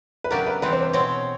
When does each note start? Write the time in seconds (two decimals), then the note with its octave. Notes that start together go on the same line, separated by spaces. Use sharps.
0.24 B4
0.30 C#3 F#3 B3 D4 G4 A#4
0.47 B4
0.62 C3 E3 G3 C4 B4
0.73 C5
0.83 C5
0.93 B2 G#3 C4 C#5